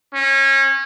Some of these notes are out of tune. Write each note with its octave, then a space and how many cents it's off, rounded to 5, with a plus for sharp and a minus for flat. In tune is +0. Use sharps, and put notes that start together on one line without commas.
C#4 -30